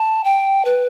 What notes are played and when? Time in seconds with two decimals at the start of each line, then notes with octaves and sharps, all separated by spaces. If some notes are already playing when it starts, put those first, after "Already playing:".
Already playing: A5
0.24 G5
0.65 B4